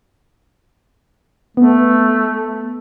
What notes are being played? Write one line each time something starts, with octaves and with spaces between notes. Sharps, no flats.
A3 B3